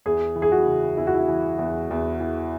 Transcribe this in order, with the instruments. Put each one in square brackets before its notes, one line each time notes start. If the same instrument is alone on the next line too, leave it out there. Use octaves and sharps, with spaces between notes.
[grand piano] E2 [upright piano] G#4
[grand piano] E3
[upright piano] G#4
F#4
[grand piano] C#3
[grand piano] E2 [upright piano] E4
[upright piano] F#4
E4
[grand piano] E3
E2
E2
E3